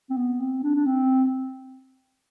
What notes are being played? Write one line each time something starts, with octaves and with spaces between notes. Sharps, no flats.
C4
B3
C4
D4
D4
C4